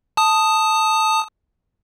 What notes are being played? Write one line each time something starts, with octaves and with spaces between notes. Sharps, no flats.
A5 D#6